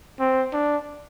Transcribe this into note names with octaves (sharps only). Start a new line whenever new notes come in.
C4
D4